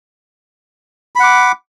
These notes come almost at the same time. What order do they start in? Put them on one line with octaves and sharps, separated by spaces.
B5 F#5 D6